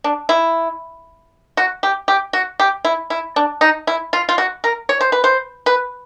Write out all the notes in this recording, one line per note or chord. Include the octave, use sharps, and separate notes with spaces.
D4
E4
F#4
G4
G4
F#4
G4
E4
E4
D4
D#4
E4
F4
F4
F#4
A#4
C#5
C5
B4
C5
B4